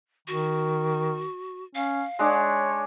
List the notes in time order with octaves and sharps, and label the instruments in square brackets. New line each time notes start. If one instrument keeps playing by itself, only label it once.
[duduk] D#3 [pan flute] F#4
[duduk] C#4 [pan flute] F5
[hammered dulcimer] G#3 D4 [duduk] C#5